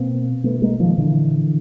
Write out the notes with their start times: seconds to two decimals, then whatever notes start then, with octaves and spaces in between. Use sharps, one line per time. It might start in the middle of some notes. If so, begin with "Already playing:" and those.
Already playing: B2 A#3 C4
0.44 B2 A3 B3
0.62 G#3 A#3
0.79 D#3 F3
0.98 A#2 D3 E3